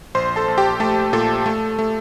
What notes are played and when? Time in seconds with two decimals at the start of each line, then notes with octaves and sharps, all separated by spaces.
0.15 A#1 C5 C6
0.36 A4 A5
0.48 A#1
0.58 G4 G5
0.80 A3 A4 A5
1.13 A#2 A4 A5
1.46 A3
1.79 A3